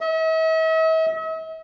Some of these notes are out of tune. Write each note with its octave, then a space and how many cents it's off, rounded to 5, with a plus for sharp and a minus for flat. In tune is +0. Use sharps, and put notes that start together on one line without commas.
E5 -45